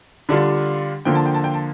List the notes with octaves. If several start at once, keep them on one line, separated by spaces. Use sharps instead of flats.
D3 G3 D4 F4
D3 F3 A#3 F4 G5
A5
G5
A5
G5
A5